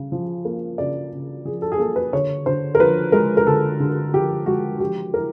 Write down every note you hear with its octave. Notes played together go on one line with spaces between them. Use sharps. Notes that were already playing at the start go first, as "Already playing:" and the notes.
Already playing: C#3
F3
A#3
C#3 D5
C#3
F3 G#4
A4
G#4
A#3 A4
B4
D3 C#5
D3 C5
A#4
F3 B4
G#3 A#4
A#4
D3 A4
D3
F3 G4
G#3 F#4
F3 G4
E4 A#4